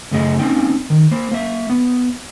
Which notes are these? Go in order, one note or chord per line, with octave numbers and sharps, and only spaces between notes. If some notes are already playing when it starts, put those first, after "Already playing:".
F#2 C#3 A3 G#4 D#5
A#3 C4 C#4 D#4 G5
D#3
A#3 C5
A#3 E5
B3